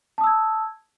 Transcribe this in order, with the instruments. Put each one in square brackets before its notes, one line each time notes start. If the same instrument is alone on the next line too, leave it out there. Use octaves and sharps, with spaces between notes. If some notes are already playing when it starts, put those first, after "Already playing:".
[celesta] A5
D#6
E6
G#6